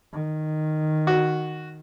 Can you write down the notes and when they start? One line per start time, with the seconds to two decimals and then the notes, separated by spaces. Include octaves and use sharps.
0.12 D#3
1.07 F#4